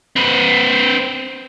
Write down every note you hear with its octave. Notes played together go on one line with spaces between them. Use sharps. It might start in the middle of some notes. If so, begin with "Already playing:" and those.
C4 B4